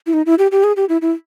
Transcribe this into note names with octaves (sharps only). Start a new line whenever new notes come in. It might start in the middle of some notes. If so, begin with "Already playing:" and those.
E4
D#4
E4
G4
G4
G#4
G4
E4
E4